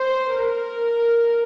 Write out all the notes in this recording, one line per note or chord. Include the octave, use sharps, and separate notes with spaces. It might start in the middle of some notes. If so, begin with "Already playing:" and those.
Already playing: C5
A#4